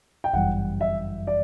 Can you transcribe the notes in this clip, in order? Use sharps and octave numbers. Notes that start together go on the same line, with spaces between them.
G5
G1 F#2 E3 G3 F#5
E5
D5